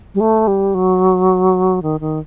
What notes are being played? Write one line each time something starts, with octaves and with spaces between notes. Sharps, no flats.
G3
A3
G3
F#3
D#3
D#3